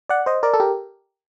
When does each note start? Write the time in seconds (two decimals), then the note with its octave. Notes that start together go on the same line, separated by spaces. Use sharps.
0.09 D5 F#5
0.26 C5 D#5
0.43 A#4 D5
0.54 A4
0.60 G4 A#4